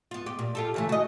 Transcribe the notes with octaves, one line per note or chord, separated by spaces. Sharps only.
B3 F4
G4
A#2
F4 G4 A4
C#3 E3 A3
F#4 D#5